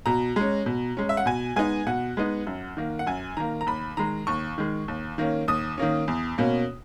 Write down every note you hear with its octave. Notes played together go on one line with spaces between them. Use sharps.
B2 A#5
G#3 C#4
B2
G#3 C#4
E5
F#5
B2 G#5
G#3 B3 D#4 G#5
B2 F#5
G#3 B3 D#4
F#2
D#3 A#3
F#5
F#2 G#5
D#3 A#3 A#5
A#5
D#2 B5
D#3 G#3 A#5
D#2 C#6
D#3 G#3
D#2
D#3 A#3 C#4
D#2 D#6
D#3 A#3 C#4
E2
B2 A#3 C#4